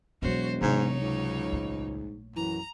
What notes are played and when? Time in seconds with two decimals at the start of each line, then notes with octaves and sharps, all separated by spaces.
0.22 E1 B2 F#3 F#4 C5 C#5
0.61 G#2 C3 F#3 G#3 D#4 C#5
1.01 C#2 G#2
1.52 A#1 A3
2.36 F#2 E3 A#5